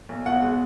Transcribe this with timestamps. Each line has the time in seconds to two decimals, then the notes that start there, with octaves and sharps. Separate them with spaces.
0.09 B1
0.26 B2 F#5
0.42 G#3